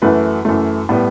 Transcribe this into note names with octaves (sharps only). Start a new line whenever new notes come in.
F#2 E3 A3 B4
F#2 E3 A3
A2 G3 B3